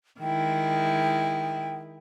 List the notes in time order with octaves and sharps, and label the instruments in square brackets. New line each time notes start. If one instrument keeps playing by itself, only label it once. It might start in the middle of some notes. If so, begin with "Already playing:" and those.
[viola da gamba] D#3 G#3 E4 [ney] G5